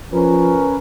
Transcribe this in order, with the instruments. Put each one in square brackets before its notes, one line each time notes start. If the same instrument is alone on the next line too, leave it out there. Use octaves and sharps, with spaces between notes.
[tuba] F3 [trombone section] C#4 A#4 B4